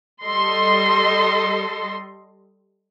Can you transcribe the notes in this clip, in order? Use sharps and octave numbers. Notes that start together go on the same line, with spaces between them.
G3 A4 D#5 C6